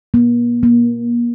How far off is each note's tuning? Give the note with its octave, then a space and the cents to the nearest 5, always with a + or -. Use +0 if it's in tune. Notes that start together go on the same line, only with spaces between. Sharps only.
A#3 +45
A#3 +30